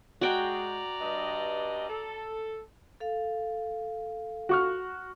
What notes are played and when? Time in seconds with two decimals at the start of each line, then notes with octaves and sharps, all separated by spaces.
0.21 G#3 F#4 D5 G5 A#5
1.01 G2 D#5
1.89 A4
3.00 A4 F5
4.49 F#4 C#6 F6